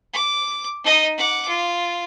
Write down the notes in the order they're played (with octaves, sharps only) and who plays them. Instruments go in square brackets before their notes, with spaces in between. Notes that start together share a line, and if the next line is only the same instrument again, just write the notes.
[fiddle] D6
D#4 D#5
F#5 D6
F4